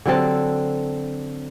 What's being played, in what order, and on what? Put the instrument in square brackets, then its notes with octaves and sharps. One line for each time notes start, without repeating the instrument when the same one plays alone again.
[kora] D3 F#3 C4 A4